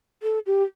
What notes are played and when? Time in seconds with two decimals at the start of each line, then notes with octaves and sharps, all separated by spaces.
0.23 A4
0.46 G4